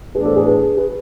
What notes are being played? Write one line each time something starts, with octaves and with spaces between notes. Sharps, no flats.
A2 E3 B3 D4 G#4 B4
A4 C5
G#4 B4
G#4 B4
G#4 B4